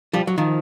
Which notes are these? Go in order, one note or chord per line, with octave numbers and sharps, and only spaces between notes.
F3 G3
F#3
D#3 F3